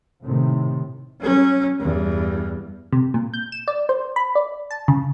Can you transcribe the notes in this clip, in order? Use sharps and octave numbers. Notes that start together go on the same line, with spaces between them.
A2 C3 D#3
F#3 C#4
E2 G2
C3
A#2
G6
E7
D5
C5
B5
D5
A5
C#3